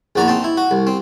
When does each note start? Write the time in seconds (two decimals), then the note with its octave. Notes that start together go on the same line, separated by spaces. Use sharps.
0.16 A#1 E2 F#4 D5 A#5
0.28 C4 D#4 A5
0.44 E4
0.57 F#4
0.71 C2
0.87 C4